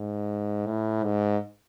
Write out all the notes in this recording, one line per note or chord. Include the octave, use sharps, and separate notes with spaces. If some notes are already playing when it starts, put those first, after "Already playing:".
Already playing: G#2
A2
G#2